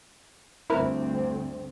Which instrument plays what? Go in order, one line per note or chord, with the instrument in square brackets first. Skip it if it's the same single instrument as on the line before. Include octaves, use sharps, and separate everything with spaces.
[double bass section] D2 G2 C4 [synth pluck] E4 A#4 B4